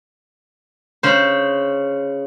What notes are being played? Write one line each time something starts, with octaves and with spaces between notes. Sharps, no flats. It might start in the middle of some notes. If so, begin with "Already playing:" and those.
C#3 C5